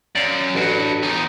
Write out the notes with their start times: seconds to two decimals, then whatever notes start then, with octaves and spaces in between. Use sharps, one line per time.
0.15 F#2 D5 F5
0.55 A1 G2 F#4
1.03 E2 D#4